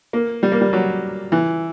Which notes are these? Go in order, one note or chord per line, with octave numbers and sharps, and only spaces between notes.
A#3
G3
A#3
G3
F#3
E3